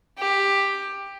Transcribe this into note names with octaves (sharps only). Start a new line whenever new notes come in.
G4